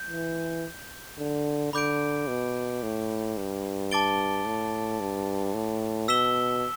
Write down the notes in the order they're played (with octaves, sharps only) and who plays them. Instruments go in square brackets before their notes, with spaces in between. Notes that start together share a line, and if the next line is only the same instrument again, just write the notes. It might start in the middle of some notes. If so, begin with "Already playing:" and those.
Already playing: [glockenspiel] G6
[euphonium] E3
D3
[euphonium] D3 [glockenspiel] B5 D6 G6 D7
[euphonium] B2
A2
G2
[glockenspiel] A5 D6 A6 D7 G7
[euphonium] A2
G2
A2
[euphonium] B2 [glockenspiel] E6 B6 E7 G7